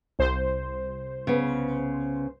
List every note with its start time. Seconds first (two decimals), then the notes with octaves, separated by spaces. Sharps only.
0.19 C2 C5
1.27 C#3 B3